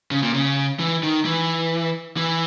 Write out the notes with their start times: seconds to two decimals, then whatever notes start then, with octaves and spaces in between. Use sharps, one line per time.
0.11 C#3
0.23 A#2
0.34 C#3
0.79 E3
1.03 D#3
1.25 E3
2.17 E3